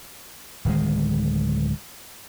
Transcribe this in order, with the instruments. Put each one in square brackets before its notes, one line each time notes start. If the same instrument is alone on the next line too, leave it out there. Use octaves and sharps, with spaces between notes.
[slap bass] D1 D#3 G#3